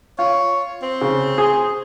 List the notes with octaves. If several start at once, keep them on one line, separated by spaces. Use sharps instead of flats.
F4 C#5
C4
C#3
G#4